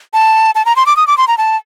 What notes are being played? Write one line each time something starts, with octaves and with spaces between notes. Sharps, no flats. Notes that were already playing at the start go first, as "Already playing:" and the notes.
A5
A5
A#5
C6
D6
D#6
D6
C6
A#5
A5